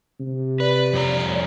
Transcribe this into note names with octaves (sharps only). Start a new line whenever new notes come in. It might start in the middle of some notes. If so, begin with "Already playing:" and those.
C3
B4 D5
F2 C#5 A#5